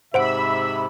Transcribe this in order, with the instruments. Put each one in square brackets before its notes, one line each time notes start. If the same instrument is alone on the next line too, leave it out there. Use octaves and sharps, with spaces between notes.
[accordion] G#2 C3 [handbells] C5 F#5 D7 [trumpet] E5 [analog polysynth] B5 E6